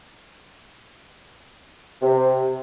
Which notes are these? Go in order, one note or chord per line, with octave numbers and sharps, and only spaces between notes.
C3